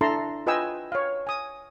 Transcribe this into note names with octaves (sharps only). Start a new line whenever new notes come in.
D4 E4 A4 A5 A#5 C6
F4 B4 D#5 G5 G#5 E6
C#5 F5
G#5 D#6